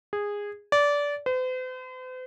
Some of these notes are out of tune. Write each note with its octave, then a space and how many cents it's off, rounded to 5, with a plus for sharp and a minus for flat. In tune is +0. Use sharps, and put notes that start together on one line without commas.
G#4 -15
D5 -20
C5 -45